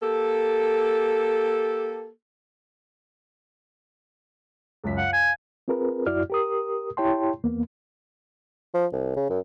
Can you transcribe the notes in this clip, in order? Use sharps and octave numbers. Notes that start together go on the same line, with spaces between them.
A#3 G4 A4
C#2 F#2 B6
F5 F#5
G#5
C4 F4 G#4 A#4 B4
F#2 E4 F#4 D5 F6
G4 A#4 D#6
E4 G4 C#5 G5 A5 C6
E2 A#3 B3
F3
C2
C#3
F#2